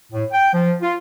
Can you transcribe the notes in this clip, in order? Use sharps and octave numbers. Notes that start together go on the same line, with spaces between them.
A2
G5
F3
F4